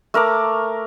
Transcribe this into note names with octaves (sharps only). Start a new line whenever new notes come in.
A3 A#4 A#5 D6